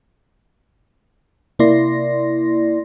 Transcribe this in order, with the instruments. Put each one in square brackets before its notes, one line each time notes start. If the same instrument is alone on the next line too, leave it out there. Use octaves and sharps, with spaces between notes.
[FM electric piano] C3 A#3 E4 D5 C6 A#6